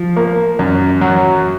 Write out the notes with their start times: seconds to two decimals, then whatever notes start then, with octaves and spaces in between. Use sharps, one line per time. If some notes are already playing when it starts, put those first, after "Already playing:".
Already playing: F3
0.16 A#3
0.59 F#2
1.01 F#3